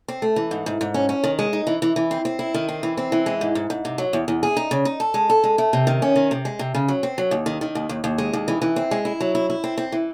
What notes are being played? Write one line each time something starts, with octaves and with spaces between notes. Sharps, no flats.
C4
A3
E3
G#2
G#2
G#2
C#4
C#4
D#3
G#3
D#4
E3
E3
E3
C4
C4
E4
D#3
C4
E3
C4
E3
G#3
G#2
G#2
G#2
C3
F#3
E2
E2
G#4
D#4
C#3
D#4
A4
G#3
A4
G#3
A3
C3
D#3
C#4
D#3
C3
G#3
C3
C#3
F#3
C4
F#3
D#2
D#3
D#3
D#2
D#2
D#2
G#3
D#2
E3
E3
C4
G#3
E4
F#3
E4
E4
C4
C4
E3